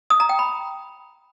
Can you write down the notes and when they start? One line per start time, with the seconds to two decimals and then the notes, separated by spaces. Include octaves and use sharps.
0.10 D#6
0.20 A#5
0.29 G5
0.39 B5